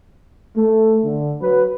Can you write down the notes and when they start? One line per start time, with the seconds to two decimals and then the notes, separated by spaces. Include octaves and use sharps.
0.56 A3
1.04 D3
1.41 F#3 B4